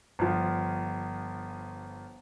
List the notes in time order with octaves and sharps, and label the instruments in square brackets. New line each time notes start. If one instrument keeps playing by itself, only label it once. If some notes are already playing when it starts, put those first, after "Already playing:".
[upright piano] G1 F3